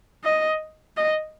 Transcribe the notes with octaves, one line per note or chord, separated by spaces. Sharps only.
D#5
D#5